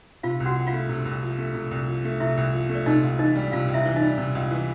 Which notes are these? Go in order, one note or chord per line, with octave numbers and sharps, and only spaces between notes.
C3 F4 F5
C2
F#4 F#5
F3 F#5
F4 F5
A3
C3
C2
F3
A3
C3
C2
F3
A3
C3 E4 E5
C2
F3
A3
D5
C3 D#4 D#5
C#2
E3 D#4 D#5
G3
C3 F4 F5
C#2
E4 E5
E3
D#4 D#5
G3
C3
C#2
E3